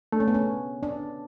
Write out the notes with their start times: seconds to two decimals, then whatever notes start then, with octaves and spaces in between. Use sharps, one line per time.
0.12 A3 D4
0.20 C#4
0.28 B3
0.34 C#4
0.83 D4